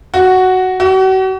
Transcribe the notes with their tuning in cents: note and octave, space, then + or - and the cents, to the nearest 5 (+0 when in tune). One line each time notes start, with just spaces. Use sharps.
F#4 +5
F#4 +40